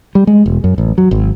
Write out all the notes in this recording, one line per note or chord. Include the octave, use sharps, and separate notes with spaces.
G3
G#3
E1
F#2
A1
F#3
G#1